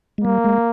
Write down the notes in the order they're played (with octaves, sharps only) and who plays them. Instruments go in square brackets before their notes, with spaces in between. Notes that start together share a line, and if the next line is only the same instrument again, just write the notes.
[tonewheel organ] G#3
[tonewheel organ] G3 [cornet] A#3
[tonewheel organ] G#3